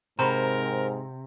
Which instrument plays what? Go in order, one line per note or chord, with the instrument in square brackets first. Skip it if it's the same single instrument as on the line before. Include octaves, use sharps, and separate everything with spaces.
[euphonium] G#2 [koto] C3 [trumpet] A#4 [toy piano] A#5 B5